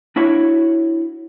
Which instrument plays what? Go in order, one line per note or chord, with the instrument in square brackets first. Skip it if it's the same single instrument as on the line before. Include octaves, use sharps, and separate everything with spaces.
[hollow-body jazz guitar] D4 E4 F#4 C#5